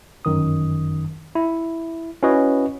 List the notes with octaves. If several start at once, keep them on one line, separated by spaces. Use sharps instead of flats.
G1 F#2 D#3 D#6
E4
C#4 E4 F#4 B4 C#5 D#5